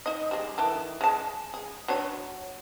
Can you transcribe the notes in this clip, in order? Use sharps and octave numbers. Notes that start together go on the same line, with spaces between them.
D#4 D#5
G3 G#3
D#3 E3 A4
G#3 A5
G#4
F#3 D4 C#5